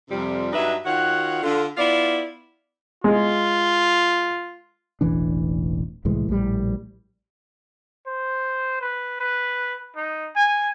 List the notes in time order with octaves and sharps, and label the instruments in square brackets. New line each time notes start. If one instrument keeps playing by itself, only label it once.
[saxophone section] F2 C3 G3
G2 F#3 D4 D#4 B4 E5
D#3 F4 F#4 C#5 F#5
D3 F4
B3 E4 F4 D5
[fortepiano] G#3 [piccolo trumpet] F4
[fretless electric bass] E1 A1 E3 D4
C2 A2 E3 G#3
A#1 A2 E3 G3
[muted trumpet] C5
B4
B4
D#4
G#5